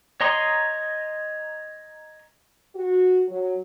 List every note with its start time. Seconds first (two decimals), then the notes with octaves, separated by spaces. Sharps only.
0.21 C#5 D#5 A#5 C6 D#6
2.75 F#4
3.28 F#3